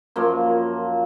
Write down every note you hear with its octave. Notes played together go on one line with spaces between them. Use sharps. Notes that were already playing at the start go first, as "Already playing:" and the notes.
F#2 F3 A#3 F4